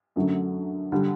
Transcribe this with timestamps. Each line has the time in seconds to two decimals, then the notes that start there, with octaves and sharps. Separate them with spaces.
0.16 F#2 D3 F#3 A3
0.92 D3 G3